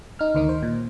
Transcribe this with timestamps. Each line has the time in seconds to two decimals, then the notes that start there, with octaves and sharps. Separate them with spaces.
0.19 D#4 F6
0.35 D2 D#3 D#4
0.49 C5
0.63 A#2